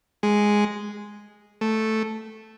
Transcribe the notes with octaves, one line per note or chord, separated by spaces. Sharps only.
G#3
A3